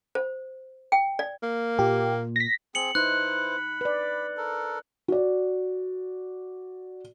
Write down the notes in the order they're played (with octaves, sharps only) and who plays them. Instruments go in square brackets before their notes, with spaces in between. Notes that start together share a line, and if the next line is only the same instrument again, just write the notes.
[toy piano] C5
G5
D5
[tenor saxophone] A#3
[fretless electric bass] A#2 [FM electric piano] G4
[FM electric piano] A#6 B6
[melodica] C4 G#4 [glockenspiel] C#7 F#7
[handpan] D#4 [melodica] E4 B4 C5 [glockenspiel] F#6
[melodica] B5
[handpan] B4 D5
[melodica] A4 A#4
[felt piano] F#4 D5